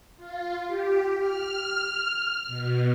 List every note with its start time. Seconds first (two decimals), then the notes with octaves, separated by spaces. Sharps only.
0.17 F4
0.67 G4
1.19 F6
2.47 B2